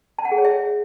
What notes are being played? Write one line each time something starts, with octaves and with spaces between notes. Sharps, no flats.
A5
F#5
G#4
C#5
E5